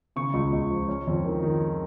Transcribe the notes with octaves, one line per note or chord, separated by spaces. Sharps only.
C#3 C#6
C#2
C#2
F3
C#4
F2
D#3
D#3